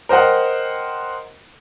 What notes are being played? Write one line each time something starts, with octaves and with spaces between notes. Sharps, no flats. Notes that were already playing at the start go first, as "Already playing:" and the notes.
A#4 C5 D#5 F#5 G5